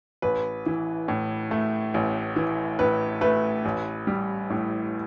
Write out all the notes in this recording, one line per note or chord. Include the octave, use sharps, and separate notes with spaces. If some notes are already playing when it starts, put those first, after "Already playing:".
A1 B4
E3
A2
A3
A1
E3
A2 B4
A3 B4
A1
G3
A2